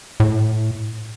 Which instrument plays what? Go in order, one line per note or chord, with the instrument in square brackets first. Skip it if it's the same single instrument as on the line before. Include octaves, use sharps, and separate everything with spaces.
[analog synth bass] A2